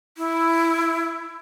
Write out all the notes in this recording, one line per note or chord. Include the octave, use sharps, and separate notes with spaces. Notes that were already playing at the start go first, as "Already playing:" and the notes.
E4